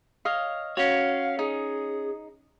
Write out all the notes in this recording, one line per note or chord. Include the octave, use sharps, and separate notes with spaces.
C#5 D#5 F5
C#4 F#4 C#5 F5
D#4 G#4